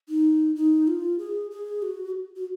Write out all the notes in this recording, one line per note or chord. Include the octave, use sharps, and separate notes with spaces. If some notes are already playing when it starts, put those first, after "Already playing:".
D#4
D#4
F4
G#4
G#4
F#4
F#4